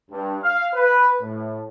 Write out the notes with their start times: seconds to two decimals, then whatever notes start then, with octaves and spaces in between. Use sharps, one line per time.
0.11 G2
0.42 F5
0.74 B4
1.21 A2